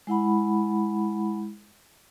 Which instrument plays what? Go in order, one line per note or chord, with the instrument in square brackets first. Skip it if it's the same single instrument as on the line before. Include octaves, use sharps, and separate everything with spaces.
[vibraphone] G#3 E4 F#5 B5